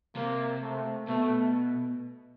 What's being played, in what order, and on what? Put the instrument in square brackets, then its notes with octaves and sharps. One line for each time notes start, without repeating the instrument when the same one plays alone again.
[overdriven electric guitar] C3 [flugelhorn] A#3
[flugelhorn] A3
[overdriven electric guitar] B2 [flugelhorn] A3